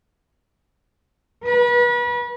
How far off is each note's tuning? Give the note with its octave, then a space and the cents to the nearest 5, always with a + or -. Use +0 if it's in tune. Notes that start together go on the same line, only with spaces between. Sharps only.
B4 -35